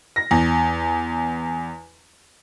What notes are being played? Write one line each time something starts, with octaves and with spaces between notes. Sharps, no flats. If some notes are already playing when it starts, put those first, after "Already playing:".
A#6
E2